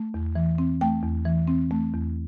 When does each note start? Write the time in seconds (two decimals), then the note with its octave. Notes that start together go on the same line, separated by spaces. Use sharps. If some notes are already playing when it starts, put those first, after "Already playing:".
Already playing: A3
0.14 E2
0.35 E3
0.58 C4
0.81 A3 G5
1.03 E2
1.25 E3
1.48 C4
1.71 A3
1.93 E2